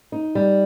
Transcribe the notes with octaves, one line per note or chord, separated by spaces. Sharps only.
D#4
G3